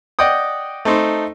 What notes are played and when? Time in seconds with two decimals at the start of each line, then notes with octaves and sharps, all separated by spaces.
0.19 D5 D#5 F#5 G5 D#6
0.85 A3 C4 D#4 C5